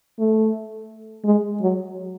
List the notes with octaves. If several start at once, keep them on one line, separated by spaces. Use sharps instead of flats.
A3
G#3
F#3